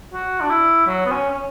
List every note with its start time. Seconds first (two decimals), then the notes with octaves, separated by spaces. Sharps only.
0.13 F#4
0.41 D4
0.50 E4
0.87 F#3
1.06 B3
1.12 C#4
1.31 C#4